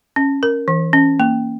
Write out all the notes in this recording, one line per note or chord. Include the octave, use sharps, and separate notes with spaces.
C#4
A#4
E3
C#4
A#3